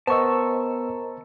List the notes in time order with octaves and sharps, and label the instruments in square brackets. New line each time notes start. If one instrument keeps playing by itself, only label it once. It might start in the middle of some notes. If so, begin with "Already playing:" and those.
[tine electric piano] B3 E6 [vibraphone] A#4 A#5 [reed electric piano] C5 D#5 [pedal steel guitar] A5 C#6